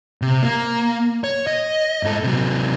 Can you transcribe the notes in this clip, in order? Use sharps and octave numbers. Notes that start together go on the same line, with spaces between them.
C3
A#3
C#5
D#5
G#2 A4
C3 F#3